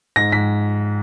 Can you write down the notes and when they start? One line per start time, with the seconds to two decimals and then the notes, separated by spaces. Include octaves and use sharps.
0.16 G#2 A#6
0.32 G#2 B6